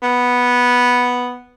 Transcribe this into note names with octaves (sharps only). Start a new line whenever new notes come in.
B3